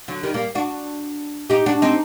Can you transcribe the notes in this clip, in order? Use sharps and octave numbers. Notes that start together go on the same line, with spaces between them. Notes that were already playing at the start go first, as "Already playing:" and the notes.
D3 F#3
D#3 G3
G3 A#3
D4 F#4
D#4 G4
D4 F#4
C4 D#4